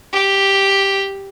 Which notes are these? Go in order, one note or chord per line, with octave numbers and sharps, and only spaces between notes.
G4